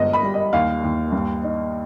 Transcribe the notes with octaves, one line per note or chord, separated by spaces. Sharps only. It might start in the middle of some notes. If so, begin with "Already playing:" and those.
Already playing: G1 G#3 D#5
B5
G3
D#5
D#2 F5
D#2
G2
D#4